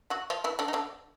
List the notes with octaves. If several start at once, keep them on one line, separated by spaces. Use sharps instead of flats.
F#3 F#4
F3 F4
E3 E4
D3 D4
D#4
D3 D4